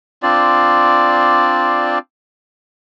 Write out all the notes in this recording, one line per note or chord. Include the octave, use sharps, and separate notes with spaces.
C4 D4 F4 D5